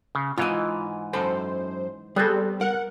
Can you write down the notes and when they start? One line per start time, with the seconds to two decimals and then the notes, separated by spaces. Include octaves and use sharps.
0.15 C#3
0.38 G#2 E3 F4 D#5
1.13 F#2 A4 C5 B5
2.16 G3 B3 C4 G#4 A4
2.61 A#4 F#5